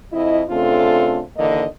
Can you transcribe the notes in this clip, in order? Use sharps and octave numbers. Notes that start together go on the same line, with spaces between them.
F2 E4 D#5
C#3 A3 C4 D4 F4 A4
D#2 D3 E3 A#3 D#5